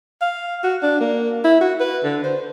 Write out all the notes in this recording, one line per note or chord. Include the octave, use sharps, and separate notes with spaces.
F5
F#4
D4
A#3
E4
F#4
B4
D3
C5